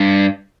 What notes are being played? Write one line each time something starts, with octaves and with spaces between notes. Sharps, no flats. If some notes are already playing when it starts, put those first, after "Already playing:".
Already playing: G2